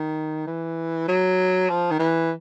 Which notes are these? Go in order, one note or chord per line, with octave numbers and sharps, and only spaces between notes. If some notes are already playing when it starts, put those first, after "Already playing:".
Already playing: D#3
E3
F#3
F3
D#3
E3